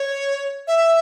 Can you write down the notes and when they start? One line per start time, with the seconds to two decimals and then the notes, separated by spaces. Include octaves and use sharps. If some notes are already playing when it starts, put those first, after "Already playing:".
Already playing: C#5
0.67 E5